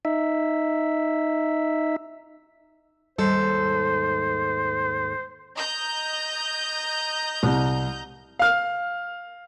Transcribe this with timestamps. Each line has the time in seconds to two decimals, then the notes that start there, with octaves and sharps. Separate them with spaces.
0.05 D#4 E5
3.18 D#2 G#2 G3 A4 C5
5.55 D#5 A#5 G6
7.43 C2
8.39 F5 F6